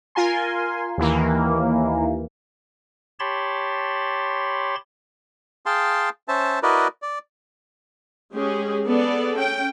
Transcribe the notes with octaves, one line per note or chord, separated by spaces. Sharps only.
F4 A#4 G#5 C6
D#2 E3 A#3
G4 C#5 A5 B5 C6 A6
G#4 F5 G5 A5 C6
C#4 C5 E5 A5
E4 F#4 A#4 B4 D5 D#5
D5
G#3 C#4 G4 G#4
B3 G#4 A4 D5
C#4 G5